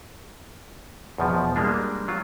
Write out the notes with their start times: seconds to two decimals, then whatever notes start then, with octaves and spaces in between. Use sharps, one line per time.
1.18 E2 B2 F3
1.56 G3 G#3 A#3 D4
2.08 F#3 F4